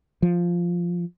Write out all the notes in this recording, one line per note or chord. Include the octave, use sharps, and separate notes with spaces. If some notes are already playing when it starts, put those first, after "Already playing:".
F3